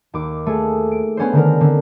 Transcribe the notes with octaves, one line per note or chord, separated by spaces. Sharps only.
D#2 D6
A3 G#4
D7
B3 C#4 D4 C5
D3 D#3 A#4
D3 C4